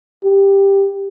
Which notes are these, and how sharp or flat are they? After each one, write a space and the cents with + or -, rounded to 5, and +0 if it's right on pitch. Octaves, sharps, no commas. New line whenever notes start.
G4 +10